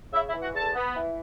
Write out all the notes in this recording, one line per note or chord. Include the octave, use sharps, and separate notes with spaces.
C#3 E4 E5
E4 E5
E3
F#4 F#5
E2 A4 A5
B3
E3